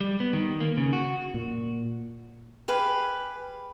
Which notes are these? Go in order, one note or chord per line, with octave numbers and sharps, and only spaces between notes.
G3
B3
D#3
A#3
C#3
F#4
A#2
G4 G#4 B4 F5